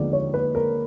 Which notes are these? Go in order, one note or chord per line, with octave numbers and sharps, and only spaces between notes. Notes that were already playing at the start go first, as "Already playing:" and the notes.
Already playing: D#2 D3 F3 G#3 B3 D5
C#5
B4
A#4